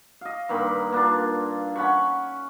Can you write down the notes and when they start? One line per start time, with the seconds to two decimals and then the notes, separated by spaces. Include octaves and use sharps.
0.21 D#5 F5
0.49 G2 D#3 A#3 B5
0.92 A#3 D4 F4
1.76 C#4 F#5 B5 C#6